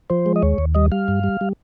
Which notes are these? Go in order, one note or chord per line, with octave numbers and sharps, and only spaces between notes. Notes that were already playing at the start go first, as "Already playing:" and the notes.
F3 C5
G#3
D#5
D#2 C#5
D#2
G3 D#5
G3 F5
G2
G3
G3